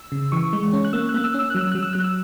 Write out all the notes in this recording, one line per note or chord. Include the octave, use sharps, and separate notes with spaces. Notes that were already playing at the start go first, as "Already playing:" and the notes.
Already playing: E6
C#3
E3 C#6
G#3
C#4
F#6
A#3 E6
F#6
A#3
E6
C#4 E6
F#3 F#6
E6
F#3 F#6
E6
F#3 F#6
E6